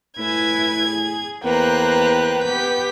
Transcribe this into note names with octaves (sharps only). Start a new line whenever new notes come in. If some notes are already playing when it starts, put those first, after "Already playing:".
A2 E4 B4 G#5 G#6
G#4
E2 A#3 B4 C5 G5 A#5 F#6
B3 G4 G6 B6